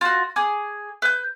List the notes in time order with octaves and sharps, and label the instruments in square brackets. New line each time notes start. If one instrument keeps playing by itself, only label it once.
[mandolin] F4 F#4
G#4 D6
B4 G6